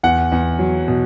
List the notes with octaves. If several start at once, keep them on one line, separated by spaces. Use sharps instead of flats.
E2 F#5
E2
F#3
B2